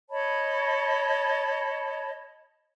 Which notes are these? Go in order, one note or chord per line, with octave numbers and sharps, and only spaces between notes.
C#5 D#5 A5 B5